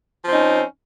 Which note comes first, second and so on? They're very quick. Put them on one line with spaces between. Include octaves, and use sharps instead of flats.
F3 C4 D#4 C#4